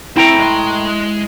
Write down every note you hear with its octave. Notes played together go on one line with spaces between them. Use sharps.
A2 C4 E4 G5 A#5
G#3 C6